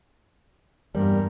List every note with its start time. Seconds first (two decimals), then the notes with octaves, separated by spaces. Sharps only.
0.95 E2 G2 G3 A#3 A#4